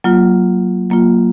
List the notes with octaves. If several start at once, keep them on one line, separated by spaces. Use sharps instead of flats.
F#3 A#3 F4
F#3 A#3 F4